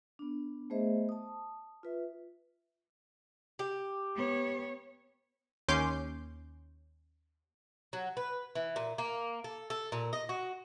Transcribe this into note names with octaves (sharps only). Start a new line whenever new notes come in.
B3 D4
A3 B3 G#4 C5 D#5 E5
A5 D#6
F4 B4 E5
G4
B3 C#5
D#2 C#4 C6 D6 G6
F#3
B4
E3
A#2
A#3
A4
A4
A#2
D#5
F#4